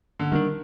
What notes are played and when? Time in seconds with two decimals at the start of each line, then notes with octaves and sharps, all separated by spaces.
0.19 D3
0.32 D#3 G3 D4